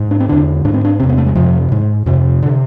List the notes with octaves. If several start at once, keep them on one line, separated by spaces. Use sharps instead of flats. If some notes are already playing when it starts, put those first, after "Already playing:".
Already playing: G#2
D4
C4
E2 D3 D4
G#2 D4
C4
D4
E2 C3 C4
B3
A3
G#3
F2 C3 F3
G#2
F2 C3
D3
C3